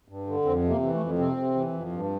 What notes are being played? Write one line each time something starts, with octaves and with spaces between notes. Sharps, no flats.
G2
D3
F2 C4
C3
A#3
E3
A3
F2
C3 C4
C3
E3
F2
G2